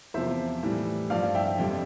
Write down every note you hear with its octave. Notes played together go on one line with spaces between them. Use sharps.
E2 C3 F3 C5 E5
A2 E3 G3
G2 F3 D5 F5
E5 G5
F2 D3 G3